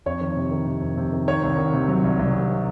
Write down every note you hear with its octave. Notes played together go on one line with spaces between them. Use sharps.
F2 C#5
D#3
C3
D#3
C3
F2
C3
D#3
D#3 C#5
C2
D#3
C3
F#3
C2
C2
C3